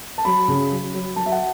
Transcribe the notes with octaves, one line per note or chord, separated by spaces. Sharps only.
A5
F#3 B5
C#3
F#3
F#3
F#3 A5
E5
F#5